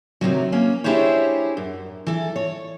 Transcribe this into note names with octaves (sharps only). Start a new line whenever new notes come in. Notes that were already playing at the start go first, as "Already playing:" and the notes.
D2 C3 D#3 F#3
A#3 C#4
D4 E4 G4 G#4 C5 C#5
F#2
E3 A4
C#5